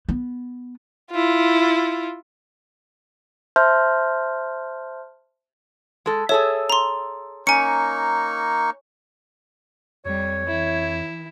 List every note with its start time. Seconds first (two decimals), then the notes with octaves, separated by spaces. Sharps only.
0.09 B3
1.11 E4 F4
3.56 C5 E5 A5 C6 F6 G6
6.06 G#3 A4
6.29 G#4 A4 C#5 E5
6.70 A#5 C6
7.47 A#3 C#4 D#4 G#5 C#6 C#7
10.06 F2 G3 C#5
10.47 E3 E4